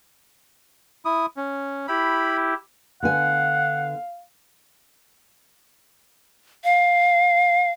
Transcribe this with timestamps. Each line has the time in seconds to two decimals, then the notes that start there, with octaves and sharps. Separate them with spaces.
1.05 E4 D#6
1.37 C#4
1.88 E4 G4 B5
3.03 D3 B3 F5 F#5 G#5
6.64 F5